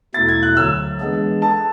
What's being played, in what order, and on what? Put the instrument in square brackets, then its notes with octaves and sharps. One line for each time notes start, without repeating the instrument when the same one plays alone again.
[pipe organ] E2 B2 A3 E4 A4 [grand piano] A6
[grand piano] G#6
F#6
[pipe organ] D2 D3 F#3 A3 [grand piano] E6
[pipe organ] E3 G#3 B3 D4 G#4
[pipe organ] A4 [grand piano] A5